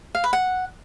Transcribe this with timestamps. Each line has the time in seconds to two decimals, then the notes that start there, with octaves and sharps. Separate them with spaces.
0.15 F5
0.24 B4
0.33 F#5